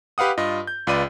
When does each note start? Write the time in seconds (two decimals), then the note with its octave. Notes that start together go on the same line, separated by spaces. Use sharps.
0.18 G4 B4 F5 F#5 D#6
0.37 G2 F4 D#5
0.67 G6
0.87 C#2 F4 B4 D5 D#7